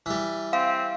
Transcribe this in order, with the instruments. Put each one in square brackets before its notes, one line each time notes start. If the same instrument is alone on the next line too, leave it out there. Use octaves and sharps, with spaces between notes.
[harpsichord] E3 G3
[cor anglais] C4 [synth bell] F5